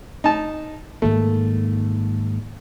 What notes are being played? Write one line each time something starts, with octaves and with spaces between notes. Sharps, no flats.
D#4 A5
G#2 D#3 A3 A#3